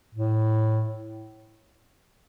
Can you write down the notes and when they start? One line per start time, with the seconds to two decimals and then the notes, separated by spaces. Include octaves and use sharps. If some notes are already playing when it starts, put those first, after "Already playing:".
0.15 A2